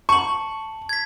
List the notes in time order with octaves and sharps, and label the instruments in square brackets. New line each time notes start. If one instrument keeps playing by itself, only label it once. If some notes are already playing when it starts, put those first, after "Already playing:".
[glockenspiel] A5 F#7 [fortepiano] C#6
[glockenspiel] G#6 B6